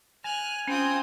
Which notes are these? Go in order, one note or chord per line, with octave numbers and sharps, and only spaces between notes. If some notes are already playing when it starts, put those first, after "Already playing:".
G#5 F6 F#6
C4 C#4 F4 G5 D#6